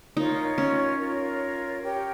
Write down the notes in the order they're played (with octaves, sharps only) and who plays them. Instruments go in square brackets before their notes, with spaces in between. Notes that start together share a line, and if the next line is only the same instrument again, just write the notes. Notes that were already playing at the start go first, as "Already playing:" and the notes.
[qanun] D#4 [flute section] F4 A#4 C#5
[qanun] C#4
[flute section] F4 A#4 C#5
G4 A#4 C#5 G5